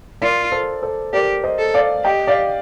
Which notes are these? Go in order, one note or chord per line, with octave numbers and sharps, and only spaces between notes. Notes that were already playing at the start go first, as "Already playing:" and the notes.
F4 A#4 D5
A4 C5
A4 C5
G4 A#4 D5
C5 D#5
A4
D5 F5
G4 D#5 G5
D5 F5